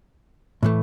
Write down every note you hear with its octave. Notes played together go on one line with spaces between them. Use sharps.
A2 E3 A3